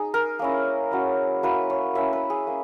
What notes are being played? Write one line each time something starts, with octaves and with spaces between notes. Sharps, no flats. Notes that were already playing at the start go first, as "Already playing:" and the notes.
Already playing: D#4 G#4
A#4
A#3 C#4 E4
F#3 C#4 E4
F#3 A#3 E4 B4
C#5
A#3 C#4 E4 E5
B4
G#4
A#3 C#4